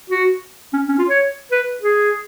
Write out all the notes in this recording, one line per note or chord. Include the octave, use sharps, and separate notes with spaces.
F#4
C#4
C#4
F4
C#5
B4
G#4